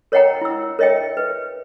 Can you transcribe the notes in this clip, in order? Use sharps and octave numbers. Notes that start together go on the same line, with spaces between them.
A#4 C#5 D#5 F#5 G5 A#5
E4 E6
A#4 C#5 D#5 E5 G5
B4